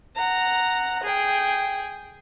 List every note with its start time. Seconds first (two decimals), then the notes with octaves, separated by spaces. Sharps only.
0.15 F#5 A#5
1.03 G#4 G5